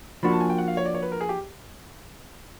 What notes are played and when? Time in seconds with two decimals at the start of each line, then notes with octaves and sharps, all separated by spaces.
0.23 F3 A#3 D4 F#4 B5
0.32 A5
0.41 G#5
0.50 G5
0.58 F#5
0.68 F5
0.77 C#5
0.85 D5
0.94 C#5
1.03 B4
1.12 A#4
1.21 G#4
1.29 G4